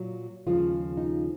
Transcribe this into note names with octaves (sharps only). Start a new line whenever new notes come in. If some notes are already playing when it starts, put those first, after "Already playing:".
Already playing: A#2 F#3
D#2 C#3 F3 G#3 F4
D#4